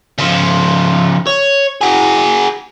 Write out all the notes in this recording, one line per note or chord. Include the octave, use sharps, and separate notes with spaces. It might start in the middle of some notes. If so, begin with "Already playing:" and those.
C#3 F3
C#5
F#4 G#4